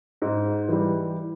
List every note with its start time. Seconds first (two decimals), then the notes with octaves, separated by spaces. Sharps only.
0.22 G#2
0.69 E3 G3